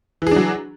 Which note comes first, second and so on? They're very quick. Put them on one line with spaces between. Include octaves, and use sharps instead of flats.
E3 G#4 D4 F#3